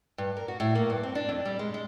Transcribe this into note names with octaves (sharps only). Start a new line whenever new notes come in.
G2
A#4
F#4
A2
A#3
G2
C4
D4
F2
G3
G#3
G#3